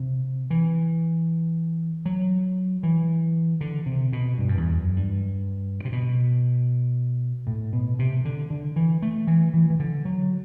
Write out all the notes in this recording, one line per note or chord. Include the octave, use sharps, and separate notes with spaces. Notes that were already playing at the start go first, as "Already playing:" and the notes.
Already playing: C3
E3
F#3
E3
D3
C3
B2
G2
F#2
E2
F#2
G2
C3
B2
A2
B2
C3
D3
D3
E3
A3
E3
E3
E3
D3
F#3